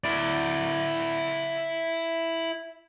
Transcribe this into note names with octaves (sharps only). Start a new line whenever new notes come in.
E4 D5